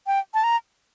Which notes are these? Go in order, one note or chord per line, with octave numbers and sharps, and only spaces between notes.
G5
A5
A#5